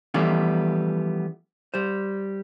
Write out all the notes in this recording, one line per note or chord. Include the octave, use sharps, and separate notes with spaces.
E3 F3 G3 A3 B3 C#4
G3 C5